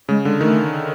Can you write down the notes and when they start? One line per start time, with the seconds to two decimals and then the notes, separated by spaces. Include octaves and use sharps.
0.09 C#3 G#3
0.24 D3 G#3
0.41 D#3 A3